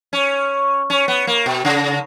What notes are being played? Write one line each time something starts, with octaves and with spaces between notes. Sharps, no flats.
C#4
C#4
B3
A#3
B2
C#3